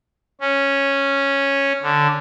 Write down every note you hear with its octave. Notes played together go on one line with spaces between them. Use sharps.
C#4
D3